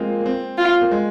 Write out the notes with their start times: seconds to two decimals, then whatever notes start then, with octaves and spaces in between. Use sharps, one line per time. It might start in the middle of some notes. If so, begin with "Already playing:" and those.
Already playing: G#3 A#3 C4 F4
0.21 A#3
0.26 C4
0.58 F4
0.81 A#3
0.91 G#3